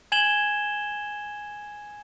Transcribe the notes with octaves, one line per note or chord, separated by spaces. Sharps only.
G#5 G#6 E7 F#7 G7